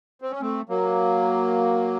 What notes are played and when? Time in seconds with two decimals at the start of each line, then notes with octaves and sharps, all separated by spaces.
0.22 C4
0.31 C#4
0.41 A3 C4
0.69 F#3 A#3